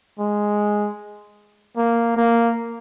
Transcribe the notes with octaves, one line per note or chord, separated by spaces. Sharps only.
G#3
A#3
A#3